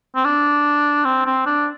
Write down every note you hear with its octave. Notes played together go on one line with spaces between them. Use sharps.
C4
D4
C4
C4
D4